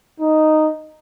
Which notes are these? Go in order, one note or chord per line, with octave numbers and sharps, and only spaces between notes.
D#4